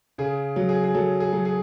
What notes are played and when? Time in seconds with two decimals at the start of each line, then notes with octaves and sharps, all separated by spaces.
0.18 C#3 G#4
0.56 F#3
0.69 G#4
0.84 G#4
0.95 F#3 A4
1.20 G#4
1.33 F#3
1.45 G#4